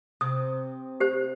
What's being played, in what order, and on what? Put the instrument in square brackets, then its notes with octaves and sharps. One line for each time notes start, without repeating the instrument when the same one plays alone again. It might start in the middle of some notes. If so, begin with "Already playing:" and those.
[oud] C3 [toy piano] D#6
[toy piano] G4 C5